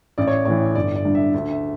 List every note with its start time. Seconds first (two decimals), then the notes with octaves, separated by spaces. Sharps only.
0.18 A1 D5
0.28 C#5
0.45 A2 E3 C#5
0.75 G1 D5
0.96 D5
1.05 G2 D3
1.15 E5
1.34 D2 E5
1.51 E5